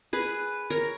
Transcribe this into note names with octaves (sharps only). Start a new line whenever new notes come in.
G#4 B4
A#4 C#5